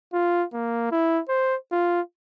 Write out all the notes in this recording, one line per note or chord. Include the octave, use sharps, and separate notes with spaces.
F4
A#3
E4
C5
F4